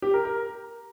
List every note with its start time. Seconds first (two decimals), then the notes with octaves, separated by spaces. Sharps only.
0.02 G4
0.14 A#4
0.25 A#4